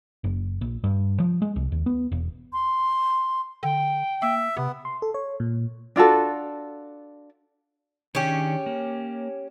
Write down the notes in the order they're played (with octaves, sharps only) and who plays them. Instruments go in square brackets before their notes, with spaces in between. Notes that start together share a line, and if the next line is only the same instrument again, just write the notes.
[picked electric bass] F#1
A#1
G2
F3
G#3
C2
D#2
B3
E1
[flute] C6
[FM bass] D3 [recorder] G5
[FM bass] A#3 [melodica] E5
[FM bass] C3 [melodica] B3
[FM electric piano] C6
A4
C#5
A#2
[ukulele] D4 F4 F#4 A4
[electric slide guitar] D#3 D4 G#4 [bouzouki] C#4 G4
[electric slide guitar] A#3